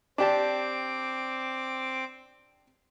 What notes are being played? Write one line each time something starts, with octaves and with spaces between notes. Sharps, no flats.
C4 D4 G4 A5 D6